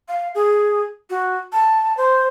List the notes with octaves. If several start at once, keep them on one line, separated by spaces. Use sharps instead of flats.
F5
G#4
F#4
A5
C5